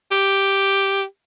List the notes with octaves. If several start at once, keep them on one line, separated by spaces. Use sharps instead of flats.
G4